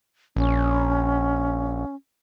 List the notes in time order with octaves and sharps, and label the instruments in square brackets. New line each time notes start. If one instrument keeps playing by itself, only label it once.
[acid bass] A#1 [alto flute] C#4